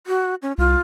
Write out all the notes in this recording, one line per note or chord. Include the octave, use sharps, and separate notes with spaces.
F#4
C#4
C2 F4